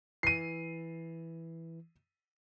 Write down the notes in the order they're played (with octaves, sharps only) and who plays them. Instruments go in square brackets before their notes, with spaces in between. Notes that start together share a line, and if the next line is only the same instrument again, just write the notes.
[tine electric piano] E3 [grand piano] C7 D#7